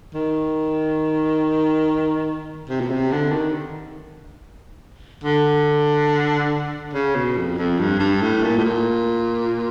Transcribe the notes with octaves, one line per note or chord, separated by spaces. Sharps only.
D#3
C3
B2
C3
D3
D#3
D3
C#3
B2
F2
F2
G2
G2
A2
A#2
A2
A#2